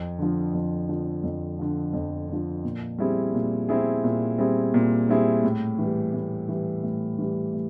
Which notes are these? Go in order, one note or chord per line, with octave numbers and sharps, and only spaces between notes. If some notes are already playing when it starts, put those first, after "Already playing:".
Already playing: F2
D3 F3
F2
D3 F3
F2
D3 F3
F2
D3 F3
A#2
G3 C4 E4 G#4
A#2
G3 C4 E4 G#4
A#2
G3 C4 E4 G#4
A#2
G3 C4 E4 G#4
A2
E3 G3
A2
E3 G3
A2
E3 G3
A2